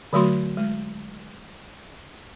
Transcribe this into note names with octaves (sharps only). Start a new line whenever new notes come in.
D3 F#3 A3 F#4 C6
G#3